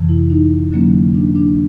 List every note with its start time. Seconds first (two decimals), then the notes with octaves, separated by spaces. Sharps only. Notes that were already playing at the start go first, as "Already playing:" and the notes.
Already playing: F2 C3 E3
0.09 E4
0.30 D#4
0.72 D3 F#3 A#3 C#4
1.15 D4
1.35 D4